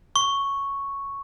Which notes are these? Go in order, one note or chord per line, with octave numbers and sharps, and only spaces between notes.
C#6